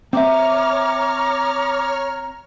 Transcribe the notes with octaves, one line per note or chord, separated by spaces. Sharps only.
C4 C#5 E5 A#5 D6 F6